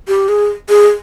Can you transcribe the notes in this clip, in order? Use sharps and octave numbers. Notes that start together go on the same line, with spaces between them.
G4
G#4
G#4